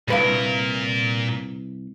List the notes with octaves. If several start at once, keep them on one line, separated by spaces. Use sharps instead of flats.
C2 A#2 A#4 B4 F5